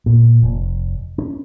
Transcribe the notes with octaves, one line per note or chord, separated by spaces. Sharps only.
A#2
F1
C#4